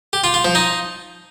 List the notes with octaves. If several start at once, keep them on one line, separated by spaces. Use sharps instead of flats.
G4
F4
F4
F3
D#4